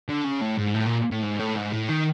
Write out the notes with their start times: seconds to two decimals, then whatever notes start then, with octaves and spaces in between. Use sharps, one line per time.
0.09 D3
0.24 C#3
0.41 A2
0.57 G#2
0.74 A2
0.86 A#2
1.11 A2
1.23 G#2
1.39 A2
1.56 G#2
1.72 A2
1.88 D#3